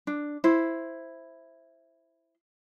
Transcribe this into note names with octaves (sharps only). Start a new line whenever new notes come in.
D4
E4 C5